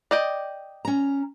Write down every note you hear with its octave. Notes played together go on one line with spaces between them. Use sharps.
D5 D#5 G5
C#4 A#5